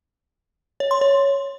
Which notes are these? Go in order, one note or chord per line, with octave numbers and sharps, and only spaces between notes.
C#5
C6
C#5